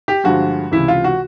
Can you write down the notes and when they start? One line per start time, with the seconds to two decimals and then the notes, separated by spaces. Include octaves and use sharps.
0.08 G4
0.24 G2 D3 F3 G#3 F#4
0.72 C#2 C3 E3 E4
0.88 F4
1.04 F#4